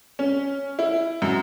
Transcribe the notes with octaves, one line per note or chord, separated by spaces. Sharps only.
C#4
E4
F#2